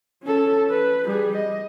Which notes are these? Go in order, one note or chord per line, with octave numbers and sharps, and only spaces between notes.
C#4 A4
B4
G3 G#4
D#5